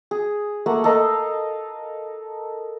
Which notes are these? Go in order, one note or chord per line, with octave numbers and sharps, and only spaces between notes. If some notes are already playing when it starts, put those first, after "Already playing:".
G#4
A3 A#3 F#5
A4 A#4 D#5 F5